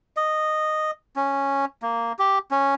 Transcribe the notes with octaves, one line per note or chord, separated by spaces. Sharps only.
D#5
C#4
A#3
G4
C#4